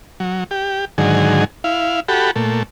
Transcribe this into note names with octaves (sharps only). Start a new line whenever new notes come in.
F#3
G4
G#2 D3 D#3 F#3 G#4
E4 F5
F#4 G4 A4 B5
A#2 A3